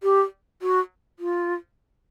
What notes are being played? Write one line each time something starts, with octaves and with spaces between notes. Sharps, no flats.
G4
F#4
F4